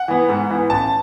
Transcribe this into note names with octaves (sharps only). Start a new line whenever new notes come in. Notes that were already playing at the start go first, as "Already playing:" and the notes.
Already playing: F#5
E3 B3
G#2
E3 B3
A1 A5